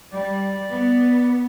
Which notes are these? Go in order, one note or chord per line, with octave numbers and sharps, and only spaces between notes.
G3 D5
B3